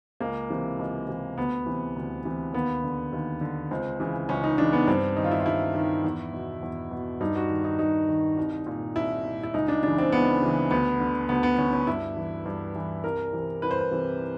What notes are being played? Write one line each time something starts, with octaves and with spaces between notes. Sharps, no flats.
C#2 A#3
C3 E3
C#2
C3 E3
D2 B3
C3 E3
D2
C3 E3
D#2 B3
D3
D#2
D3
C#2 C4
C#3 E3
C#2 C#4
D#4
C#3 E3 D4
B3
G2 C4
D#3 D#4
F4
E4
F4
G2 E4
D#3
E2
B2
E2
B2
G2 D#4
F#4
D#3
D#4
G2 D#4
D#3
C2
A#2
C2 E4
A#2
E4
C#2 D#4
D4
C#3 E3 D4
C4
C#2 B3
C#3 E3
D2 B3
D3
D2 B3
B3
D3 C#4
C#4
G2 E4
E3
G2
E3
C2 A#4
C3 E3
C2 B4
C5
B4
C3 E3